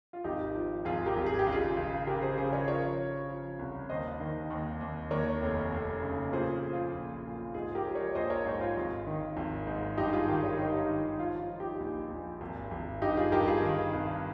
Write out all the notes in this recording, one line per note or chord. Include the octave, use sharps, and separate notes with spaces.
F4
G#1 D#4 G4
F3
G#1 F4 G#4
G4 A#4
G#1
G#4
G4
C#2
F4 G#4
C#2
C#3 G4 A#4
G#4 C5
C#3 G#4 C5
A#4 C#5
F3 A#4 C#5
F3
F3
C2
D#2 C5 D#5
D#3
D#2
D#2
D#2 A#4 C#5
F1
F1
C#3
A#2 G#4 C5
F3
F4
A#1
A#2
G#2 F4 G#4
G4 A#4
F3
A#4 C#5
A#1 C5 D#5
A#4 C#5
G#2
F4
G#1
D#3
G#1
G#2
G2 D#4 G4
F4 G#4
D#3 G4 A#4
A#4 C#5
D#3 D#4 G4
D#3
F3 F4
F4
F3
D#4 G4
A#1
A#1
G#1
G#1
G2 D#4 G4
F4 G#4
G2 G4 A#4
F4 G#4
D#3
C2